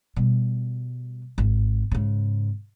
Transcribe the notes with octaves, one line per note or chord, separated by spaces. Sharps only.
B2 G3
G#1
G#2 C#3